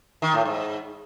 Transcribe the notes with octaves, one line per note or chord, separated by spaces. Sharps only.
D#3
A2
G#2